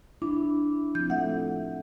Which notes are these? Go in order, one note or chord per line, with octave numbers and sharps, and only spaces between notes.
D4 E4
F3 C4 G6
A3 E5 F#5